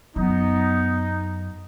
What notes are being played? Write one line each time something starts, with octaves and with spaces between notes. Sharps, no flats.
F#2 B3 D#4